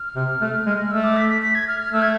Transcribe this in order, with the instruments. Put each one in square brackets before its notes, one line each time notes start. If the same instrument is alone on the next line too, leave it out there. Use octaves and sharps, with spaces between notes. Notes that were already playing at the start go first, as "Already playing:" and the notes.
Already playing: [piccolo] F6
[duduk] C3
A3
G#3
[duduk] A3 [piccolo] E6
[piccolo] D6
B6
B6
B6
G#6
F6
F6
[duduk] A3 [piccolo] E6
[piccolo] G#6